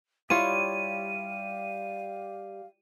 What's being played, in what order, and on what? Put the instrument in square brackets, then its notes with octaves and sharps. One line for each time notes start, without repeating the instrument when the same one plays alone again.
[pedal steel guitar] G3 G4 [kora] E4 F4 C#5 [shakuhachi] F5 [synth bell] D#7